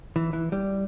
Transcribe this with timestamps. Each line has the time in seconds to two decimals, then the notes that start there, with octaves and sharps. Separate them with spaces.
0.16 E3
0.33 E3
0.52 G3